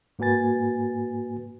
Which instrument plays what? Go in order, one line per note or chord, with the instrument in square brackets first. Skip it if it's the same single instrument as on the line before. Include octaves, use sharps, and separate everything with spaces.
[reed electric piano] G#2 A#3 F#4 B4 G#5 A6